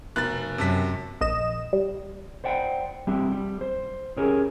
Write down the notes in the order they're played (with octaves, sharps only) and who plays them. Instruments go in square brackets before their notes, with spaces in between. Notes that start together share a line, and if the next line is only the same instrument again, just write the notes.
[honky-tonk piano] F1 B2 A#4 [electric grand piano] F#6 A6
[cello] F#2 [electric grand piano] C3 A5 B6
[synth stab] A#1 D#5 E7
G3
[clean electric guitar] C5 D5 F#5 G5
G3 C4 D4 G4 E5
G3
C5
C#4 G4 G#4 A#4 C#5